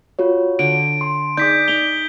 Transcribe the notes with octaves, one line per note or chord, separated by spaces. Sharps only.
F4 F#4 C#5
D3 D7
C6
D#4 G#4 D5 D6 G6 B6
D#4 A#5 G7